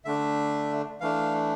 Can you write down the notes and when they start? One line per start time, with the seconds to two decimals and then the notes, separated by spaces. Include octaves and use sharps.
0.05 D3 A3 D4 E5
1.00 E3 A3 D4 F5